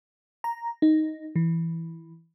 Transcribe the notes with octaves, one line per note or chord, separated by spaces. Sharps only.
A#5
D#4
E3